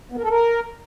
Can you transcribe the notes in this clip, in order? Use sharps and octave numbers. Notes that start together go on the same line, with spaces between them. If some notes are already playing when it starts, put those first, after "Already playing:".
B3
A#4
A4
A#4